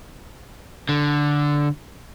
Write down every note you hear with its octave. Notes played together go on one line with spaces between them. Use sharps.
D3